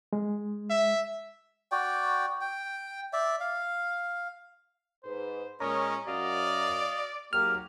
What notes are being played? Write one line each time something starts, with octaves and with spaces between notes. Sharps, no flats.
G#3
E5
F#4 D5 G5
G5
D5 E5
F5
G#2 B4 C5
A#2 G#3 C#4 A#4 C#5 D#5 A#5
F#2 F#4 D5 D#5 F5
G#2 F#3 A#3 G4 F6